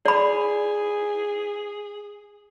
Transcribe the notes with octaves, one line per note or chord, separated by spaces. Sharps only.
G#4 D5 B5